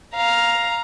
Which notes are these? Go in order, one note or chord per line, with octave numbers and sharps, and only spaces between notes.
F5 A#5